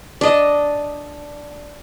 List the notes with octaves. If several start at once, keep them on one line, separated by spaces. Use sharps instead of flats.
D4 D#5